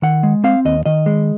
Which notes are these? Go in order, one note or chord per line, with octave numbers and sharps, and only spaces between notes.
D#3 F#5
G#3
C4 F5
D#2 D#5
D#3 D#5
G#3